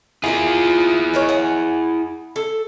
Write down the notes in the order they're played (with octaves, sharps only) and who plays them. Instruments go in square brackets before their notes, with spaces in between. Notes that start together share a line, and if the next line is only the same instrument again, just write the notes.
[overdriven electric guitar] E4 G#4 [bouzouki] F4 A#4 E5
[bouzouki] D#4 A#4 C#5
F#5 G#5
A4